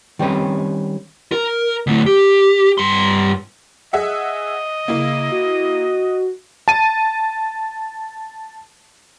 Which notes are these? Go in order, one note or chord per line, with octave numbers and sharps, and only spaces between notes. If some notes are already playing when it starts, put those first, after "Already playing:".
D#3 G3 C4 C#4 B4
A#4
D2 A2
G4
G2 C6
G#4 D#5 E5 F#5
C#3 A#3 E4
F#4
A5 D#7